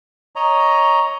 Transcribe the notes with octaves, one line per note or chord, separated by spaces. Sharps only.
C#5 D#5 A#5